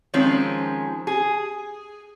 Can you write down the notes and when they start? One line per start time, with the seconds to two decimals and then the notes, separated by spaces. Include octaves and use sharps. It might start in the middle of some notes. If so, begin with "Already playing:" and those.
0.14 D#3 F3 G#3 C4 C#4
1.07 G#4